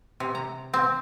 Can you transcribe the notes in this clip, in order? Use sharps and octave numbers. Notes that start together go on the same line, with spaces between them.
C3
A#5
C4